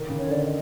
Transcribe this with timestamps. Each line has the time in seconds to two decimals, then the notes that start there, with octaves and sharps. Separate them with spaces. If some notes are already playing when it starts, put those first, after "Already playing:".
Already playing: D#3
0.09 C#3
0.19 C#5
0.27 D3 D5
0.46 D#5